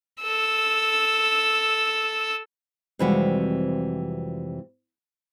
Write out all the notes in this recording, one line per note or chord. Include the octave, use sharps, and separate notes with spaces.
A4 E6
F2 C3 E3 G3 G#3 F#4